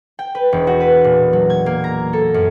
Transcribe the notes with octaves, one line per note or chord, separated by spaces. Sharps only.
G5
B4
E1
F#4
B4
A#2
F#3
G#6
A#3
A#5
A4
F#2